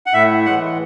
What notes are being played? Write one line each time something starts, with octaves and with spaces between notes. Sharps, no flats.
F#5
A2 E5
E3 G#3 F#5